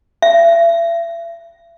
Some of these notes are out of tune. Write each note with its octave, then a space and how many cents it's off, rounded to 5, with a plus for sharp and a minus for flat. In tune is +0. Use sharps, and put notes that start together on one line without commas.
E5 +40